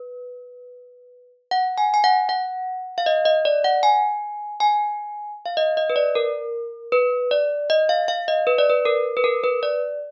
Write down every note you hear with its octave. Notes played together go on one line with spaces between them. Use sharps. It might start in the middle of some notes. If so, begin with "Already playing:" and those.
Already playing: B4
F#5
G#5
G#5
F#5
F#5
F5
D#5
D#5
D5
F#5
G#5
G#5
F5
D#5
D#5
B4
D5
A#4
B4
D5
D#5
F5
F5
D#5
B4
D5
B4
A#4
B4
A#4
B4
D5